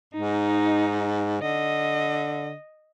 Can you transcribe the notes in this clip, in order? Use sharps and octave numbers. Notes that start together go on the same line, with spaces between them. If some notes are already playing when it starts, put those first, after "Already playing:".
G#2 D#4
D3 D#5